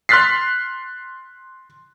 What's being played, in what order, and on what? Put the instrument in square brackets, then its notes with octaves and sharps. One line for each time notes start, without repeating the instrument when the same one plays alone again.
[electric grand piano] C6 F6 F#6 A6 B6 C7